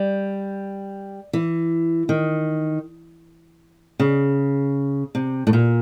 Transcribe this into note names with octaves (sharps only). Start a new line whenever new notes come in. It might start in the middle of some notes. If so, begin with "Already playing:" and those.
Already playing: G3
E3
D#3
C#3
C3
A2
A#2